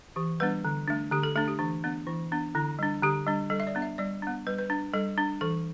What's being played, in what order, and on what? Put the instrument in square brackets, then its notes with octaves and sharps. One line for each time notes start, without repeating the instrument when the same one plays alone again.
[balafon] E3 G4
G3 B3 D4 B4
D3
A3 D4
D3 G4
A4
A3 D4 A4
G4
E3 D4
B3 D4
E3 E4
B3 D4
D3 E4
G3 D4
D3 G4
G3 D4
G3 A4
E5
D5
B3 D4
E5
G3 D5
B3 D4
G3 B4
B4
D4
G3 A4
D4
E3 A4